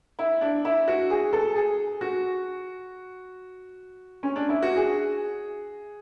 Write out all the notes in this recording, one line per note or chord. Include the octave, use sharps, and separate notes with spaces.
E4
D4
E4
F#4
G#4
A4
G#4
F#4
C#4
D4
E4
F#4
G#4